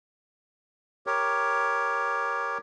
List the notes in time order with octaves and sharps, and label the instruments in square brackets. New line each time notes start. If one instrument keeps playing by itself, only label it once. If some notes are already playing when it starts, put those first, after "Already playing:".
[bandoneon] G4 A#4 C#5